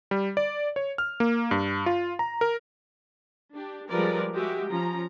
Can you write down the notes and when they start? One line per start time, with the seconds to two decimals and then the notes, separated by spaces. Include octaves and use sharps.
0.11 G3
0.37 D5
0.76 C#5
0.98 F6
1.20 A#3
1.51 G2
1.86 F4
2.19 A#5
2.41 A#4
3.53 D4 G4
3.88 F3 G3 G#3 A#4 B4 D5
4.34 G#3 F#4 G4 E5
4.71 F3 C#4 A#5